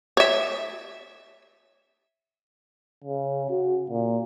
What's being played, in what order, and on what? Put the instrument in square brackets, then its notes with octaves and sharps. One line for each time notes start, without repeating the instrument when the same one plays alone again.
[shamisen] C#5 E5
[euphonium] C#3
F#4
A#2